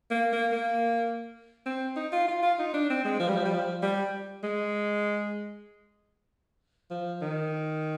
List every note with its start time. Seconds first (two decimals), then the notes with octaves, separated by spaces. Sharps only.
0.11 A#3
0.33 A#3
0.52 A#3
1.66 C4
1.96 D#4
2.13 F4
2.28 F4
2.43 F4
2.59 D#4
2.74 D4
2.90 C4
3.05 G#3
3.20 F3
3.28 G3
3.37 F3
3.45 G3
3.54 F3
3.82 G3
4.43 G#3
6.91 F3
7.22 D#3